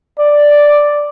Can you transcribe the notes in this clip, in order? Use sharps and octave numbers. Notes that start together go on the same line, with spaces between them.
D5